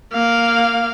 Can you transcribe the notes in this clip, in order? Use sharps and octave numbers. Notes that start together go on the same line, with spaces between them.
A#3 F5